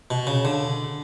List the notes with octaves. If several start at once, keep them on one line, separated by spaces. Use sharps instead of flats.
B2
C#3
D3